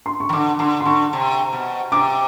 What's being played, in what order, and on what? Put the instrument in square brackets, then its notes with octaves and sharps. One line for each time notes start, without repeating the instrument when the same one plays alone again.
[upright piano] C6
C#6
[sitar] D#3
[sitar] D3 [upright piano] D6
[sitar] D3 [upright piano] C6
[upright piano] C6
[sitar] D3 [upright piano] C#6
[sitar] C3
B2
[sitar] C3 [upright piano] D6